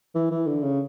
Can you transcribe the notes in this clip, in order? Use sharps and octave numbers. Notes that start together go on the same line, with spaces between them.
E3
E3
D3
C#3